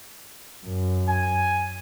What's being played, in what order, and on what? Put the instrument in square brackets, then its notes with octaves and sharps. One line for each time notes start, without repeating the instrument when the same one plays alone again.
[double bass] F#2
[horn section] G#5